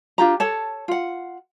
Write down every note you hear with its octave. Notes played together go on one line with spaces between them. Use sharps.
D4 F4 G4 A#5
A4 C#5 A5
F4 F#5